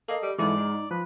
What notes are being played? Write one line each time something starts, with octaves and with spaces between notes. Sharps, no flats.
A#3 A4 D#5
G3
G#2 E3 G#3 E4 A4 D5
D#4
F3 B4